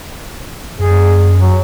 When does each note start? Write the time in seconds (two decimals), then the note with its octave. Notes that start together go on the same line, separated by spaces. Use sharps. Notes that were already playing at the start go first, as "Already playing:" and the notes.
0.79 F#2 G#4
1.38 F#3